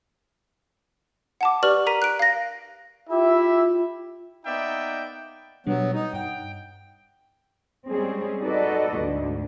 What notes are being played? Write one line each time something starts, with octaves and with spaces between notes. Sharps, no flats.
F#5 A5 D6
G4 B4 D5 C#6 F6 F#7
A#4 A#5 B6 D#7
F#6 D7
F5 A#6
E4 F4 G4 E5
A#3 B3 D#4 D5 E5 G5
B2 F#3 G3 B3 D4
D#4
G2 F#5 G5
G3 G#3 C4 C#4 G#4
D#4 F#4 A4 B4 D5 D#5
D2 G#2 D3